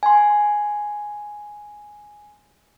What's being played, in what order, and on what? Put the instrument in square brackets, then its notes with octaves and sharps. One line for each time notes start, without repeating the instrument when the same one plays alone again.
[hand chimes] G#5 C6